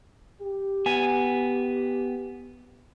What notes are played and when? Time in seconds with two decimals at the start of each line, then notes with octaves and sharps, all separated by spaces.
0.42 G4
0.86 B3 G#5